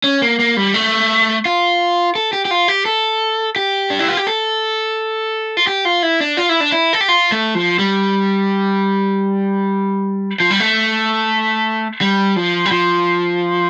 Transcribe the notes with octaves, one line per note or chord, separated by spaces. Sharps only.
C#4
A#3
A#3
G3
A3
F4
A4
G4
G4
F4
G4
A4
G4
D4
E4
F4
G4
A4
F4
G4
F4
E4
D4
F4
E4
D4
E4
A4
G4
F4
A3
F3
G3
F3
G3
A3
G3
F3
G3
F3